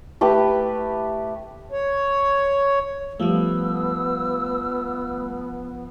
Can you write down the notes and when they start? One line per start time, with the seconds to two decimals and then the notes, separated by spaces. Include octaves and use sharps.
0.21 A3 G4 B4
1.72 C#5
3.20 F3 G3 A3 B3 E6